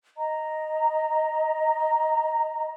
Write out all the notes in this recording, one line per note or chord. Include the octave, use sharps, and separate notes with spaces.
D#5 A#5